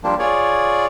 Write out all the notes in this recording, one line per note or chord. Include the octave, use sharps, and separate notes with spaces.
F3 G3 A#3 D4
F4 G#4 C#5 D5